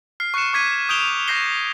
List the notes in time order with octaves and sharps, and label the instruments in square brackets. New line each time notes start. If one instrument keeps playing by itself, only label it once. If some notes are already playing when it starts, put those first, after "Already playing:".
[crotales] F6 C7
C#6 F#6 C7 C#7 E7
C#6 D6 G#6 B6 D#7
D#6 G6 D7 E7 F7 G7
C#6 F6 G6 A#6 C7 G7